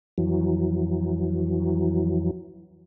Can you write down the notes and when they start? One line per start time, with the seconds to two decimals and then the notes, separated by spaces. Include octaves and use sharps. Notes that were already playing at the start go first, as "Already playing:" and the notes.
0.18 F2 E3 F#3